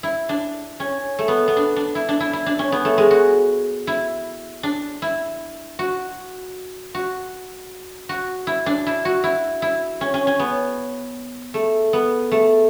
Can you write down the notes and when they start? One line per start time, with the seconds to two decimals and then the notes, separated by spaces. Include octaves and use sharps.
0.03 E4
0.29 D4
0.80 C#4
1.19 A3
1.28 B3
1.48 B3
1.57 D4
1.76 D4
1.95 E4
2.09 D4
2.20 E4
2.33 E4
2.46 D4
2.59 C#4
2.72 B3
2.85 A3
2.98 G#3
3.11 F#4
3.87 E4
4.63 D4
5.02 E4
5.79 F#4
6.95 F#4
8.09 F#4
8.47 E4
8.66 D4
8.86 E4
9.05 F#4
9.24 E4
9.62 E4
10.01 C#4
10.14 C#4
10.27 C#4
10.39 B3
11.54 A3
11.93 B3
12.32 A3